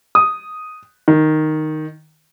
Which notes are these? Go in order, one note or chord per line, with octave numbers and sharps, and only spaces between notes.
D#6
D#3